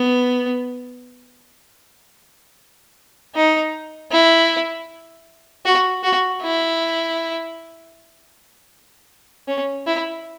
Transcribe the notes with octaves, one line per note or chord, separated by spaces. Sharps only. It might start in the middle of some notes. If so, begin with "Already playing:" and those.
Already playing: B3
D#4
E4
F#4
F#4
E4
C#4
E4